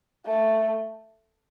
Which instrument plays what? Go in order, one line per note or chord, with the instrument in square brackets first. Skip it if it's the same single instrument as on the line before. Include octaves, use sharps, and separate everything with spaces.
[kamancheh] A3